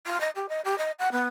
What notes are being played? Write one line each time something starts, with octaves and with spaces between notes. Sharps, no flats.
F4
D#5
G4
D#5
G4
D#5
F#5
B3